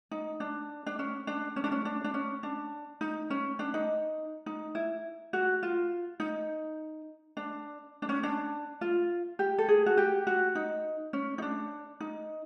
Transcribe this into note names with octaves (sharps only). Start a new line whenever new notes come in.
D#4
D4
D4
C#4
D4
C#4
D4
C#4
D4
D4
C#4
D4
D#4
C#4
D4
D#4
D#4
E4
F#4
F4
D#4
D4
D4
C#4
D4
F4
G4
A4
G#4
F#4
G4
F#4
D#4
C#4
D#4
D4
D#4